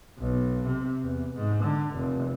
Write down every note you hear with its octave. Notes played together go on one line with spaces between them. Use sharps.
B1
C3
E2
G#2
D3
F1